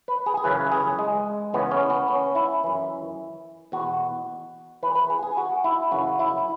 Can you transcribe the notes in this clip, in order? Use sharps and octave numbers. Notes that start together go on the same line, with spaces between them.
B4
G#4
G#4
F#2 C#3 E3 B4
G#4
G#3
E2 C#3 E3 B3
C#4
B3
C#4
E4
F#2 E3
E2 B2 F#4
E2 E3 B4
B4
G#4
G#4
F#4
E4
F#2 C#3 E3 F#4
E4